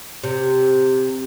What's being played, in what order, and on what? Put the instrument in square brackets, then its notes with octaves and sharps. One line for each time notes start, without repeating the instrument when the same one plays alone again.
[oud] C3